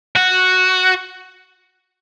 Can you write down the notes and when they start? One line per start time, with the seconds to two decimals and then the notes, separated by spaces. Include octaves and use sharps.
0.16 F#4